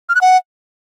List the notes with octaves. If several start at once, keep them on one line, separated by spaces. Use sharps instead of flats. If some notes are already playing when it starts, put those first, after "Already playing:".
F6
F#6
F#5